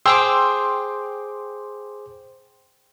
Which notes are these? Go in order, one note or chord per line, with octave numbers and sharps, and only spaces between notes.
G#4 C5 G5 C6 D6 E6